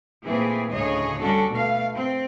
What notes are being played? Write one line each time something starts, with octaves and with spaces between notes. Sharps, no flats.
A#2 E3 A3 C4 G#4
D2 A2 C#3 G#4 C#5 D#5
G3 C#4 D4 F#4 A4
B2 A3 F5
C4